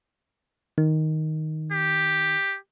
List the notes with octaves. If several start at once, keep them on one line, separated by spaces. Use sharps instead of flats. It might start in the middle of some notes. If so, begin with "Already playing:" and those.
D#3
G4